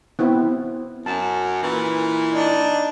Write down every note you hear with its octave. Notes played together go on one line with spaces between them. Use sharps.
B3 C4 E4
F#2 A5
A#2 E3
D4 D#4